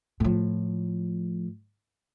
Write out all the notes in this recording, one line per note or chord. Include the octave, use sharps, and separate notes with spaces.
A2 F3